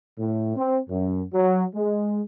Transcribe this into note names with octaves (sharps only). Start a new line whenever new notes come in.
A2
C4
F#2
F#3
G#3